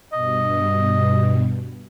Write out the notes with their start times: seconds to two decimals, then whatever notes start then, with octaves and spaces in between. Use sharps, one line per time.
0.13 G2 B2 D#5